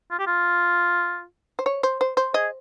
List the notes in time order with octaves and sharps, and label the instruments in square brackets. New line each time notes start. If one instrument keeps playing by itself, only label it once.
[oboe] F4
G4
F4
[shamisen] C5
C#5
C5
C5
C5
[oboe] G#4 [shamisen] D#5